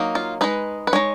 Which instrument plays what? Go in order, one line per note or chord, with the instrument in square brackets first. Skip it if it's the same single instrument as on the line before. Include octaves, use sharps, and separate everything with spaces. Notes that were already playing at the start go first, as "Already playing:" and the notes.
Already playing: [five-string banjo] F#3 A#3 D#4
F4
G#3 D#4 B4
B4
G#3 D#4 C#5